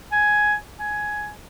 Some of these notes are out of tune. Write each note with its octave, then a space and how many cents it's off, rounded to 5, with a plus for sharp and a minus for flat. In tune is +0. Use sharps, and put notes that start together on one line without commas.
G#5 +10
G#5 +10